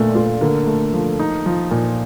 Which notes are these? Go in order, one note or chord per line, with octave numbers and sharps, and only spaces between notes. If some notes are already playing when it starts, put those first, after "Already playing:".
Already playing: A#2 A3 D4
A3 F4
D3 A#3
A3
F3
D#4
F3
A#2